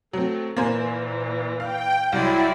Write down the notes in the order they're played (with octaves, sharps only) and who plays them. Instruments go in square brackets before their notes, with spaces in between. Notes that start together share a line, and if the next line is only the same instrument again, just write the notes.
[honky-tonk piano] F#3 C4 [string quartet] A3
[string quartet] A#2 E3 [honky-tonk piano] A#3 C5 G#5
[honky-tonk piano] F5 [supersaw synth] G5
[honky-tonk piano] C2 [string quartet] F#3 G#3 D5 [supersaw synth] E4